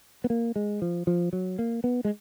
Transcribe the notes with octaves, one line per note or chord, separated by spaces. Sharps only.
B3
A#3
G#3
F3
F3
F#3
A#3
B3
G#3